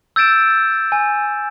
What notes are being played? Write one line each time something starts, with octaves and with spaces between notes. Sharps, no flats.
E6 G6 A6 D7 E7
G#5